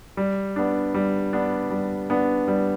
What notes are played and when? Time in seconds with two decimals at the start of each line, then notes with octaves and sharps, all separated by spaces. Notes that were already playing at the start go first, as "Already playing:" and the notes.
0.17 G3
0.56 B3 D4
0.94 G3
1.33 B3 D4
1.70 G3
2.10 B3 D4
2.48 G3